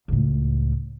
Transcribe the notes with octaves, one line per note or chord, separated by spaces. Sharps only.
C#2 A2